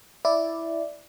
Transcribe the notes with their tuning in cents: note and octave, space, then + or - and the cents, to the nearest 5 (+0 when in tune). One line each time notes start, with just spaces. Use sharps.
E4 +0 D5 +0